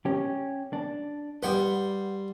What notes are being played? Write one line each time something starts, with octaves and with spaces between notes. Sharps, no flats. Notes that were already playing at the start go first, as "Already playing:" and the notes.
C#4 G4
D4
G3 B4 F#5 G5 C6